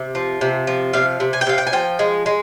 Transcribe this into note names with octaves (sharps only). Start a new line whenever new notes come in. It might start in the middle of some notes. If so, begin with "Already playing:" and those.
Already playing: C3
F3
C3
F3
C3 F5
C3
G#5
G5
C3 F5
G5
G#5
F3 G5
G#3
G#3